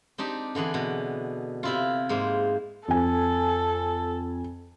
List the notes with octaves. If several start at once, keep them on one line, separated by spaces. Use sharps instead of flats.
C4 D4 D#4 G4
D3 E3 D4 G#4
B2
C3 E4 F4
G#2 A#3 C5
F2 A4 G#5